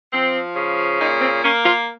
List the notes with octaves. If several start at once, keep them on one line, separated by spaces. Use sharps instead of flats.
F3 C4
C#3
A#2 D#4
C4
A#3 C#4
F4